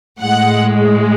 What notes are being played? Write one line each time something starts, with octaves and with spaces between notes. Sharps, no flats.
A2 G#3 F#5